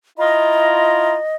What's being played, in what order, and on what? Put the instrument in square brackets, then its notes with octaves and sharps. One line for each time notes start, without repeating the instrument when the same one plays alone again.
[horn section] E4 F4 A#5 [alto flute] D#5